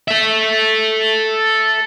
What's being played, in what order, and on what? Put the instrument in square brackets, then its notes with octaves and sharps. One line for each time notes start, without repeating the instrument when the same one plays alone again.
[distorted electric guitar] A4 E5